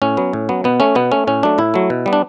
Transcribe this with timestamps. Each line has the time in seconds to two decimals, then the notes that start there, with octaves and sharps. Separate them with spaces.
0.02 A2 C#4
0.17 F#3 B3
0.33 A2
0.49 F#3 B3
0.64 B2 B3
0.80 A3 C#4
0.95 B2 B3
1.12 A3 C#4
1.27 A2 C#4
1.43 F#3 A3 D4
1.58 A2 E4
1.74 F#3 A3
1.90 B2
2.06 G3 B3
2.13 D4